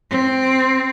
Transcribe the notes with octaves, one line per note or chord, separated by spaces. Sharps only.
C4